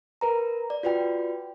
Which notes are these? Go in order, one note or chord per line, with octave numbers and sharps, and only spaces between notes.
A#4 B4 A#5
D5
F4 F#4 B4 D5 G5